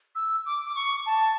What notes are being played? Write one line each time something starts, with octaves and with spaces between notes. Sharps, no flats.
E6
D6
D6
C#6
A5